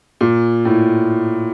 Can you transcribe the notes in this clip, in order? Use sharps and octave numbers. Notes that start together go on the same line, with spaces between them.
A#2
A2